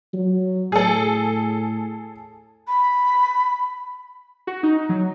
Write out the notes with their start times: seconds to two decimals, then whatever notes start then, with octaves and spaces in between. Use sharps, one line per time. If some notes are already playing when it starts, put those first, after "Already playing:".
0.14 F#3
0.72 A2 G#4 A4
2.67 B5
4.47 F#4
4.63 D#4
4.89 F#3